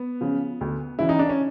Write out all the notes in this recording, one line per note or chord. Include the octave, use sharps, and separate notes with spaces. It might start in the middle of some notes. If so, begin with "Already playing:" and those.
Already playing: B3
C#3 F3
D2
C#3 E3 E4
D#4
D4
C#4